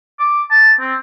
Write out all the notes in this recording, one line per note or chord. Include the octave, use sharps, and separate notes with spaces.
D6
A5
C4